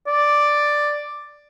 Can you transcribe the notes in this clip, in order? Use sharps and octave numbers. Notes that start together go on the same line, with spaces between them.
D5